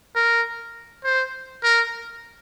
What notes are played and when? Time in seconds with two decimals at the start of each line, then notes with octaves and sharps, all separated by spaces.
0.15 A#4
1.04 C5
1.64 A#4